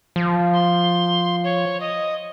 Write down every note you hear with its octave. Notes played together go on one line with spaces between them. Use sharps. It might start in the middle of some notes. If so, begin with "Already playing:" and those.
F3
C6
C#5
D#5